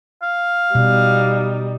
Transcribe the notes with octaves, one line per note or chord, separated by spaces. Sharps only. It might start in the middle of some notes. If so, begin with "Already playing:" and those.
F5
B2 G3 D#4